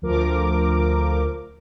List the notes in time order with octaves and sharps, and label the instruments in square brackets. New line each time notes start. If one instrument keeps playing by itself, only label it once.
[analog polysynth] D2 F3 A#4 D6